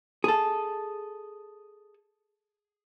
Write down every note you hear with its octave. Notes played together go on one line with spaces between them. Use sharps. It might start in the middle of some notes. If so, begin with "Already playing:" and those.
G#4 A4